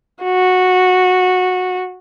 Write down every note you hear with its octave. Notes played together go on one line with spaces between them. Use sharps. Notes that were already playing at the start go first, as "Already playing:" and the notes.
F#4